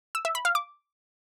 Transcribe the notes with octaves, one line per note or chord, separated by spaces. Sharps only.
E6
E5
B5
F5
D6